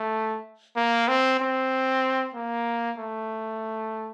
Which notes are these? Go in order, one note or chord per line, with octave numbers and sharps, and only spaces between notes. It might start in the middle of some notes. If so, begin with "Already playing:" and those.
Already playing: A3
A#3
C4
C4
A#3
A3